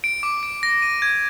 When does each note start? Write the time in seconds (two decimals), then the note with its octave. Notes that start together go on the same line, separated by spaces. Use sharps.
0.04 D7
0.23 D6
0.43 D7
0.63 A#6
0.82 D#7
1.02 G#6